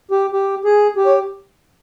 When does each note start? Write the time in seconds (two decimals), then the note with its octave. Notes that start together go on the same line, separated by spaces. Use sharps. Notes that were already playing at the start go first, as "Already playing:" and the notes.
0.11 G4
0.32 G4
0.65 G#4
0.97 G4
1.06 C#5